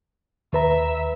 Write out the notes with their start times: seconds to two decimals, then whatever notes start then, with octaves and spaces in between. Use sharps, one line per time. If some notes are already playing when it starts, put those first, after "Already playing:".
0.53 D#2 B4 E5 A#5